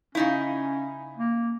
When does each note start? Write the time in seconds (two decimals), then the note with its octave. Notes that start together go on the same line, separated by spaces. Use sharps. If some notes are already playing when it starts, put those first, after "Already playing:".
0.15 C#3 C#4 D#4 E4
1.17 A#3